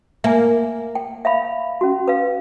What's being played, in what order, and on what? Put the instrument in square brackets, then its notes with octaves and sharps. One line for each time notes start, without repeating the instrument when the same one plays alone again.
[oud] A#3 [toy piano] E5 G#5
[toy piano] G5
E5 F5 B5
C#4 F#4
B4 F5